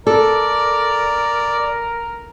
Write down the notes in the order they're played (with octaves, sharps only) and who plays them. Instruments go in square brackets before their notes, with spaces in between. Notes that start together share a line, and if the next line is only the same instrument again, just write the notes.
[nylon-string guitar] A4 [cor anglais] A#4 [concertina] D5